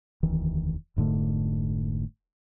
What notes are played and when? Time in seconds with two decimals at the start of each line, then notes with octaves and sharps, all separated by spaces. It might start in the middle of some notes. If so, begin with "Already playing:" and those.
0.23 E1 D2 D#3 E3
0.96 F1 G#2 D3 A3